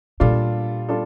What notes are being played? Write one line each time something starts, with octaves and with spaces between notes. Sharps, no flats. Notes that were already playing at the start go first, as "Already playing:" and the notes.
A#2 G3 D4 F4 A4
G3 D4 F4 A4